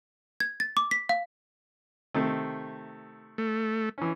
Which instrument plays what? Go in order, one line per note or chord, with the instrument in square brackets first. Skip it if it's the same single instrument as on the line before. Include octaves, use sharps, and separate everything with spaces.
[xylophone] G#6
A6
D6
B6
F5
[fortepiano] C3 D#3 A3
[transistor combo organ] A3
[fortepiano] E3 C#4